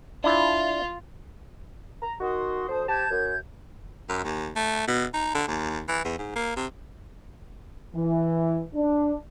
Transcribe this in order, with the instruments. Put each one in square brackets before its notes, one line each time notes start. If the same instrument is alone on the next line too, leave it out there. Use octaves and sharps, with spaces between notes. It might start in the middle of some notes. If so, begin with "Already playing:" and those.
[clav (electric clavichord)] D4 E4 [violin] F4
[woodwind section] A#5
[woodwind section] D#3 F#4 [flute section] C6 D#6
[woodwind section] D2 C5 [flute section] A5 D#6
[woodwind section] G4 C5 A5 [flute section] G6 G#6
[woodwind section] F#2
[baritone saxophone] F#2
D#2
A3
B2
D#4
D3
D#2
E3
E2
G#2
A#3
C3
[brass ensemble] E3
D4